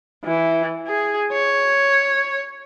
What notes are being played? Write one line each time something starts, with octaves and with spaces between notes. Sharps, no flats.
E3
G#4
C#5